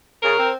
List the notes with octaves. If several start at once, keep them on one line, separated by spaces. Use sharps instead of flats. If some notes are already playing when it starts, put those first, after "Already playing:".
C#3 A#4
C4